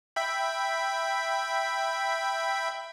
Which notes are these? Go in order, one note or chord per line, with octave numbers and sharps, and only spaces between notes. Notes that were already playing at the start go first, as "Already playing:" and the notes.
E5 G5 B5